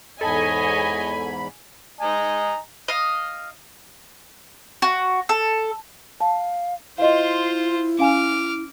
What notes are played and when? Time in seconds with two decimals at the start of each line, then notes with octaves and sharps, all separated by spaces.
0.21 E2 G#2 A4 C#5 D#5 G#5 B5
2.00 D#5 G#5 A#5
2.88 D#5 F5
4.82 F#4
5.29 A4
6.21 F5 A5
6.98 E4 F4 C5 D#5 F5
7.99 C#4 F5 G#5 D6 F6